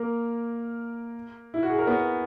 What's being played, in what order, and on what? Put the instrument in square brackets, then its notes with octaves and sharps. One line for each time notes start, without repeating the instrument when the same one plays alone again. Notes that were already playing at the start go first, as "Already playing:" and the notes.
Already playing: [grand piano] A#3 A#4
E4
F#4
G#4
A#4
B3 B4